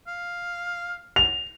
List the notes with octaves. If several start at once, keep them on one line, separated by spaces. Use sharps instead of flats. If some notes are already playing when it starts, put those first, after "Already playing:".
F5
F7